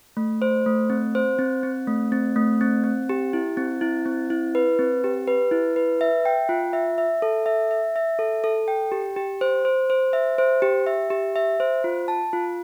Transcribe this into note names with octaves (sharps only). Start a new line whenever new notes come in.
A3
C5
A3
C4
C5
C4
C4
A3
C4
A3
C4
C4
G4
E4
C4
E4
C4
E4
B4
C4
G4
B4
E4
B4
E5
G5
F4
E5
E5
A4
E5
E5
E5
A4
A4
G5
G4
G4
C5
C5
C5
E5
C5
G4
E5
G4
E5
C5
F4
A5
F4